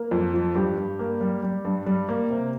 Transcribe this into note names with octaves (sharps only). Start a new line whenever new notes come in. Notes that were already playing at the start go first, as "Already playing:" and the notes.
Already playing: A#3
F2
F3
G2 G4
G2
A#3
G3
G3
G2
G3
A#3
C3